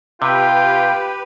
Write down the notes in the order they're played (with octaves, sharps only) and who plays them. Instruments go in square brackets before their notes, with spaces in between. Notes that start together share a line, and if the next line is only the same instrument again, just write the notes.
[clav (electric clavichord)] C3 [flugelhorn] F4 [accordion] G4 B4 [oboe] G5